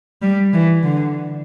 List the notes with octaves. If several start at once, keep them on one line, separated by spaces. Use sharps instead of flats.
G3
E3
D3